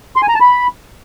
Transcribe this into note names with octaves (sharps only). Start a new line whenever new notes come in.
C6
G#5
A#5
A5
B5